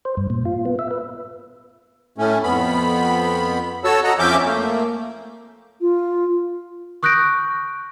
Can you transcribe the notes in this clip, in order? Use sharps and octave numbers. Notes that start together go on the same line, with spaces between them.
C5
G2
A#2
F4
B3
E5
B4
A2 A3 C#4
F2 B3 B5
F#4 A4 C#5 A5 E6
D#5 F#5 A#5
F2 F3 C#4 E5 D6 G6
A3 A#3
F4
C#6 D#6 F#6 G6 A#6 D7